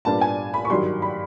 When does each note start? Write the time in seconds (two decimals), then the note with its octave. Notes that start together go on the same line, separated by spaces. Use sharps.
0.05 A#2 G3 B3 D4 A5
0.21 G#5
0.54 B5
0.65 C#6
0.70 G2 D#3 F#3 C6
1.02 B5